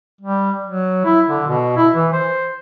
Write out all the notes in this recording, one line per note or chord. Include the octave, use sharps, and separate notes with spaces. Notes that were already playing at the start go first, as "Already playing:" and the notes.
G3
F#3
E4
D3
B2
E4
E3
C5